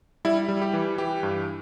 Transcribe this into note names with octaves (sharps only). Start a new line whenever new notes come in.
G3 E4
G3
G4
E3
E3 G4
G2